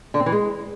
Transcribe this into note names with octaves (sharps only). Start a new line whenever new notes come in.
D3
C4
E3
G#3